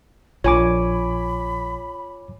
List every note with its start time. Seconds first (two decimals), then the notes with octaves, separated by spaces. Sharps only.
0.44 A#1 F4 C#5 G#5 B5 D6